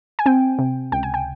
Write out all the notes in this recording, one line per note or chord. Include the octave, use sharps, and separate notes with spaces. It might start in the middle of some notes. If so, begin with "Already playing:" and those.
G#5
C4 G5
C3
C#2 G5
G#5
G5